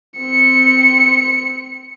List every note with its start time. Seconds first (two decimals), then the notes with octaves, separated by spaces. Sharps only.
0.18 C4 C#7